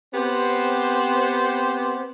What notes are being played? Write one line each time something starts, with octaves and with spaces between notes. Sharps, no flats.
B3 C4 G4 C5